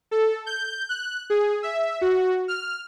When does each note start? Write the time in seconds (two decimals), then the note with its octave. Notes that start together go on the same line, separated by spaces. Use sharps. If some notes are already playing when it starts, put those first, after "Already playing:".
0.11 A4
0.46 G6
0.89 F#6
1.30 G#4
1.63 E5
2.01 F#4
2.48 F6